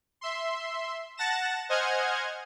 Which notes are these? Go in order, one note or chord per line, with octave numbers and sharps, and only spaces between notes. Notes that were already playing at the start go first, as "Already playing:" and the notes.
E5 C6
F#5 A5 A6 A#6 E7
C5 D#5 F#5 G#5 F6 G#6